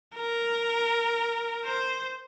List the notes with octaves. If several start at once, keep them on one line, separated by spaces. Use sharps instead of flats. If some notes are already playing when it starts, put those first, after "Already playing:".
A#4
C5